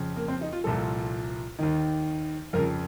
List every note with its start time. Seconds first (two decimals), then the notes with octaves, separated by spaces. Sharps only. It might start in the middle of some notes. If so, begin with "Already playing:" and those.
Already playing: F2 C#3 F3
0.16 A#3
0.28 C4
0.41 D#4
0.52 F4
0.64 C2 A#2 F3 A4
1.59 D#2 D#3
2.53 F2 C#3 F3 A#4